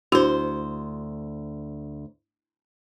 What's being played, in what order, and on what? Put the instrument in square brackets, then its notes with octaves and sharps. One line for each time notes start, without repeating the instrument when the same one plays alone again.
[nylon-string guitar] D2 C5 [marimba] D4 E4 F#4